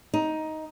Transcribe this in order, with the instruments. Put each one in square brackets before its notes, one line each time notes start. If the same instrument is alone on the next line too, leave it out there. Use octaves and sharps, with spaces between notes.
[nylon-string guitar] D#4